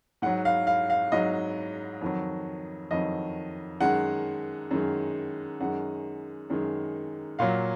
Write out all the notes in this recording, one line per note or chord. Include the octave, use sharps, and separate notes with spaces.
G#2 F#3 F#5
F5
F5
F5
G#2 F#3 D#5
F2 D#3 F#3
F2 D#3 F#3 D#5
F#2 D#3 G#3 F#5
F#2 D#3 G#3
F#2 D#3 G#3 F#5
F#2 D#3 G#3
A#2 F#3 F5